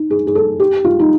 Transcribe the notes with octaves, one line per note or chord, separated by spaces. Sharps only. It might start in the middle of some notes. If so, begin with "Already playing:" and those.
Already playing: D#4
G#4
G#4
A4
G4
F4
D#4